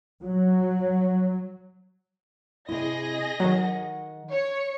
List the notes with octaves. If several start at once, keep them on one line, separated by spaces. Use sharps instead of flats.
F#3
C3 E4 G#4 D#5 A#6
D#3 F#3 F#5
C#5 C#7